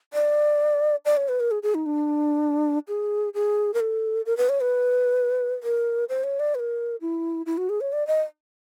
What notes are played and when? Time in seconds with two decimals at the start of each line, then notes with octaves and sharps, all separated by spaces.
0.14 D5
1.05 D5
1.17 C#5
1.29 B4
1.40 A#4
1.51 G#4
1.63 G#4
1.75 D#4
1.86 D4
2.88 G#4
3.34 G#4
3.74 A#4
3.80 A4
4.26 A#4
4.37 B4
4.49 C#5
4.61 B4
5.63 A#4
6.09 C5
6.24 C#5
6.39 D5
6.55 B4
6.59 A#4
7.01 E4
7.46 E4
7.58 F#4
7.69 G#4
7.81 C#5
7.93 D5
8.07 D#5